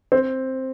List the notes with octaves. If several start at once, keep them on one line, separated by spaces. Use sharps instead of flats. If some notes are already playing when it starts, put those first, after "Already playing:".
C4